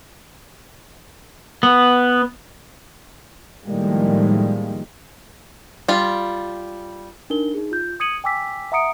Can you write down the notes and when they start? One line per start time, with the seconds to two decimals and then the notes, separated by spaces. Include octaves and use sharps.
1.63 B3
3.65 A2 D#3 F3 G3 G#3 A#3
5.88 G3 F4
7.30 D4 D#4 A#4 G7
7.54 D#4 G#4
7.71 F4 G6
8.00 D#6 G#6 C#7 D#7 F#7
8.24 G5 G#5 D6 E6 B6
8.72 E5 F#5 A#5 D#6 C#7 D7